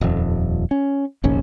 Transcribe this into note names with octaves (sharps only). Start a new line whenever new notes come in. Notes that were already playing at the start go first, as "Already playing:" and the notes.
D#1 F2
C#4
F1 A#1 D#2 C#4